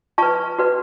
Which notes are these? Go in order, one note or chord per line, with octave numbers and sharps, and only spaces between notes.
F4 B4 A5 C#6
F#4 B4